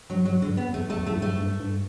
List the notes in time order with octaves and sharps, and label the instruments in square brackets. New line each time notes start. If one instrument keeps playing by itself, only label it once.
[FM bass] G2 [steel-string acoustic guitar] F#3
[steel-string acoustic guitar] F#3
[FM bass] F#2 [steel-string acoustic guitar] D3
[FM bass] G2
[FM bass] F#2 [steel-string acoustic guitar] B3
[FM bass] E2 [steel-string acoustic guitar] A3
[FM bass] E2 [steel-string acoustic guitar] A3
[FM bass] F#2
[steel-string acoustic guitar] A3
[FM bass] A2
G2
[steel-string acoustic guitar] A3
[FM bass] G2
G2